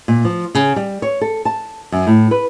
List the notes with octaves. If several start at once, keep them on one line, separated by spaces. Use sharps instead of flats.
A#2
F3
C#3
G3
C#5
A4
A5
F#2
A2
B4